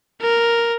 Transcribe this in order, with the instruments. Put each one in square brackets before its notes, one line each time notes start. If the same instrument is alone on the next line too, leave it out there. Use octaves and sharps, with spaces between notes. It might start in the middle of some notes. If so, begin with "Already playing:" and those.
[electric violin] A#4